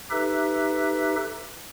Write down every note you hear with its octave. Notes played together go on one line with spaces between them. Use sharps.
D#4 G4 A4 B4 E5